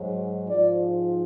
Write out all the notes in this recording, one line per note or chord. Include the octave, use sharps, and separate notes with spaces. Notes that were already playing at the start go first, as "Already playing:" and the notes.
Already playing: G#2 F#3
G#2 F3 D5